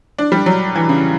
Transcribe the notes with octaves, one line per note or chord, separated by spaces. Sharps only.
D4
G3
F#3
E3
C#3